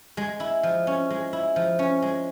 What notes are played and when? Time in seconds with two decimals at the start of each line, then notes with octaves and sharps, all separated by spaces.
0.17 G#3
0.40 E4
0.63 F3
0.87 C#4
1.10 G#3
1.33 E4
1.56 F3
1.79 C#4
2.02 G#3